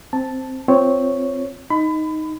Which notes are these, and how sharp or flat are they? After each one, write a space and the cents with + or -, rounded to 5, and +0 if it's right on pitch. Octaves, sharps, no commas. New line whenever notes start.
C4 +0 A5 +0
C4 +0 F4 +0 C#5 +0
D#4 +5 B5 +30